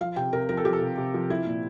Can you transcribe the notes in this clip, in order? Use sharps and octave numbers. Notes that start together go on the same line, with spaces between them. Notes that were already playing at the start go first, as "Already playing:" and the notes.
F3 F5
C3 G5
C3 A#4
F3 A#4
A4
F3 G4
A4
C3
C3
F3
F3 E4
A#2